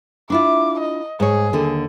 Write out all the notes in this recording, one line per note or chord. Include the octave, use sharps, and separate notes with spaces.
D4 E4 F4 D6
D#5
G#2 G#4 C#5
D#2 D3